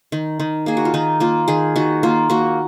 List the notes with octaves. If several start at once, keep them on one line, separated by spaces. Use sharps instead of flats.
D#3
D#3
A#3 G#4
F#4
F4
D#3 D#4
A#3 F4
D#3 G#4
D#3 F#4
A#3 F4
A#3 F#4